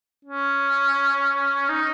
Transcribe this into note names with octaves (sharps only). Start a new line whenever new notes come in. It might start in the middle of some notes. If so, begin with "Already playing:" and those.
C#4
D#4